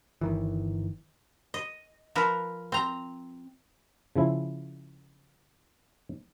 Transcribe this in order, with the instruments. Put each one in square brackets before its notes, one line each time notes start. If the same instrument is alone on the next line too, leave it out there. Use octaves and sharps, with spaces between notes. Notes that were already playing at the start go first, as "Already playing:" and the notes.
[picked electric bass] G1 D#3 E3
[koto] D#5
F3 A#4 B4
C4 A#5
[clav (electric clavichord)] C#3 F3 E4